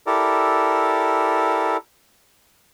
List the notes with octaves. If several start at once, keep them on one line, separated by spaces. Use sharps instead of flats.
E4 G4 A4 A#4 D5